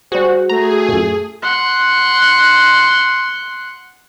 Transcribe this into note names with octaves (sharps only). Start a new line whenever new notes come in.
G3 F#4 G#4 C5
A3 G#4 A#5
F#2 A#2
F#5 C6